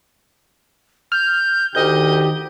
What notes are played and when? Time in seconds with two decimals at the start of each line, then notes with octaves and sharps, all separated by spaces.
1.12 F6 G6
1.75 D2 D#3 G4 D#5 G6